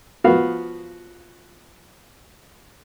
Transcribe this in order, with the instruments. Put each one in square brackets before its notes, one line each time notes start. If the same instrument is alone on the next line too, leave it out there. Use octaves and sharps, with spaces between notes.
[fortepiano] F3 B3 F#4 F5